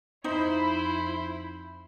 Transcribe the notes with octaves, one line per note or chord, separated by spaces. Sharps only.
F2 D#4 E4 C5 B5